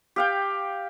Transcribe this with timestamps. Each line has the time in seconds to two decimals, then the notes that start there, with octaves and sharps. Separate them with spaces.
0.16 G4 F5 G5